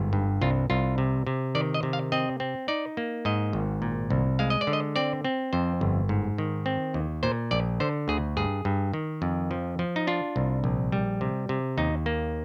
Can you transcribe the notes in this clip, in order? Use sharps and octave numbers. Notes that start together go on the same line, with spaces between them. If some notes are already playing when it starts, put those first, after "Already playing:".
Already playing: G1 G#2
G2
C2 F4
C2 F4
C3
C3
D#3 D5
D#5
C3
F5
C4 D#5
C4
D#4 D5
A#3
G#2 D#5
G#1
A#2
C2
G#3 F5
D#5
D5
D3
D#5
C4 D5
C4
F2 C5
G1
G#2
D#3
C4
D#2
A#2 C5
A#1 D5
D3 C5
D2 G#4
G2 G#4
G2
D#3
F2
F3
F3
D#4
D4 F4
C2
A#1
G3
C3
C3
D#2 D#4
A#3